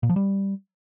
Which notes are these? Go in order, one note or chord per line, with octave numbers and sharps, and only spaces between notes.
A#2
F3
G3